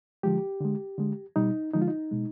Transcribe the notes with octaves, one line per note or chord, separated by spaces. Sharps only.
D3 F3 G#3 G4
D3 G#3
D3 G#3
B2 G3 D#4
D3 F3 G#3 D#4
F4
D#4
B2 G#3